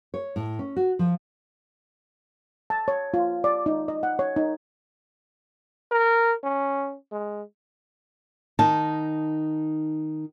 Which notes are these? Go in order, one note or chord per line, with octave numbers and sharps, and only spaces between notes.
C#5
A2
C#4
F#4
F3
A5
C#5
F4
D5
D#4
D#5
F#5
C#5
D#4
A#4
C#4
G#3
D#3 D#4 A5